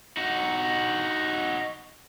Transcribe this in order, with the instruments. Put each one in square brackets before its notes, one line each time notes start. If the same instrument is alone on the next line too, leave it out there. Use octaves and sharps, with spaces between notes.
[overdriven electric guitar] D#4 F#4